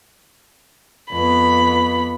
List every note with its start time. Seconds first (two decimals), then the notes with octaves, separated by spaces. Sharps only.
1.12 F2 B3 B5